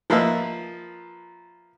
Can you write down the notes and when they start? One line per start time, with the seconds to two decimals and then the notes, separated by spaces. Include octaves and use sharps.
0.10 F3 A#3 B4 D#5 E5